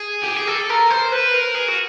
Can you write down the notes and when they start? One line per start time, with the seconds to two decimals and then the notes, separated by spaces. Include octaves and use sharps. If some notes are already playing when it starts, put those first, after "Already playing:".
Already playing: G#4
0.23 G4
0.36 G#4
0.47 A4
0.69 A#4
0.91 C5
1.12 B4
1.34 A#4
1.55 G#4
1.68 F#4